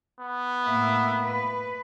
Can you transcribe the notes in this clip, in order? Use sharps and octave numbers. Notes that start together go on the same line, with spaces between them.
B3
A2 A#3 E5
B4